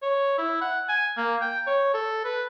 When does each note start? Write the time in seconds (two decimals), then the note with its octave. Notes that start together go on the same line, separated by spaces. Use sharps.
0.02 C#5
0.38 E4
0.61 F#5
0.89 G#5
1.17 A#3
1.41 G5
1.67 C#5
1.94 A4
2.24 B4